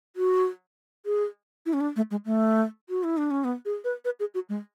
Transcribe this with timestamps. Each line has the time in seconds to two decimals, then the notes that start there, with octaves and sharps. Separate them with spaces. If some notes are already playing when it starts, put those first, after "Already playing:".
0.16 F#4
1.06 G#4
1.66 E4
1.73 C#4
1.81 D4
1.96 A3
2.11 G#3
2.26 A3
2.89 F#4
3.04 E4
3.17 D4
3.31 C#4
3.44 B3
3.65 G#4
3.84 B4
4.05 B4
4.20 G#4
4.34 F#4
4.49 G#3